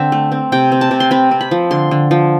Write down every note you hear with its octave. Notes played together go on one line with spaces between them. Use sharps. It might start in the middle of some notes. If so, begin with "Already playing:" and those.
Already playing: D3 C4 E5 G5
A3
C4
C3 G5
C4
A5
C3
C6
C4 B5
C4
B5
F3
D3 C6
D3
F3